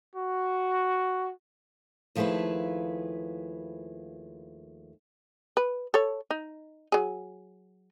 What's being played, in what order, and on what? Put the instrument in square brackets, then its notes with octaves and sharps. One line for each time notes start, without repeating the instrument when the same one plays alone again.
[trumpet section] F#4
[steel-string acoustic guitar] D#2 F3 A3 E4 G#4 B4
[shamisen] B4
A4 C#5
D#4
F#3 G#4